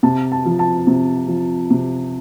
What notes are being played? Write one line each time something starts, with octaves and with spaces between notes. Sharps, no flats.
C3 A5
A5
F3
A5
C3
F3
C3